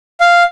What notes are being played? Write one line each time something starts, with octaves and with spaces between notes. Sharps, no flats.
F5